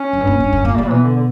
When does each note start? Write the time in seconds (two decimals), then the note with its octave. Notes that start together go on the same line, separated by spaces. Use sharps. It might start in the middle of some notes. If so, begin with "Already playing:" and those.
Already playing: C#4
0.13 F#2
0.21 G2
0.27 A#2
0.40 G2
0.53 F#2
0.65 A#2 A#3
0.78 A#2 G3
0.86 F#3
0.90 B2 E3
1.03 D3
1.16 D3